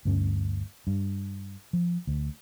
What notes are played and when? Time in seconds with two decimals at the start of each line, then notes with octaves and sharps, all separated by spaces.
0.05 D2 G2 C#4
0.87 G2
1.73 F3
2.07 D2